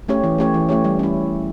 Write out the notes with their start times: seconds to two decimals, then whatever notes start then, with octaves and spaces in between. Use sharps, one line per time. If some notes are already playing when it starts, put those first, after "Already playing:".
0.08 A3 C#4 G4 C#5
0.24 E3
0.38 A3 C#4 G4 C#5
0.54 E3
0.69 A3 C#4 G4 C#5
0.84 G3
0.99 C#4 E4